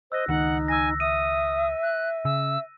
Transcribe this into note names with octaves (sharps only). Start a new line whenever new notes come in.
C5 D#5 E6 F#6 A#6
C#2 D#3 D#4 F#5
G#5 E6 A#6
E5 D#6 D#7
F#6
C#3 E6